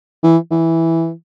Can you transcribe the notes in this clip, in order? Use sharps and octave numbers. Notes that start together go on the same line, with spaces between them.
E3
E3